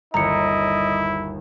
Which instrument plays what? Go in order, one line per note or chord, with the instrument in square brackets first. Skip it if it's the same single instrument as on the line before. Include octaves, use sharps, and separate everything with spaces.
[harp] G1 D#2 [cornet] E4 [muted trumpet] D#5 [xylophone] A#5 C#7